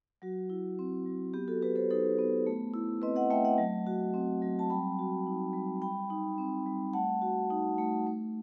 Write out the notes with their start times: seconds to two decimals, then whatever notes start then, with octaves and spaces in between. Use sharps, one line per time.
0.22 F#3 F#4
0.50 E4
0.79 C4
1.06 F#3
1.34 B3 G4
1.48 F#4 A4
1.62 F#4 G4 B4
1.76 A4 C5
1.90 D#4 A4 C5
2.19 B3
2.47 A3
2.74 E4
3.02 C4 B4 D#5
3.16 D#5 F#5
3.30 A3 E5 G5
3.45 D#5 F#5
3.58 F#3
3.87 F#4
4.14 C4
4.42 F#3
4.59 A5
4.70 G3 G5 B5
4.99 F#4
5.27 D#4
5.54 G3
5.82 G3 G5 B5
6.10 D#4
6.38 C4
6.66 G3
6.93 A3 F#5 A5
7.22 F#4
7.51 D#4
7.78 A3
8.07 A3